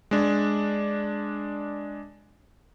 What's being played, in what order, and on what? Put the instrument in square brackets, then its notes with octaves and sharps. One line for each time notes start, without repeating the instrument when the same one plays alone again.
[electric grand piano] G#3 D4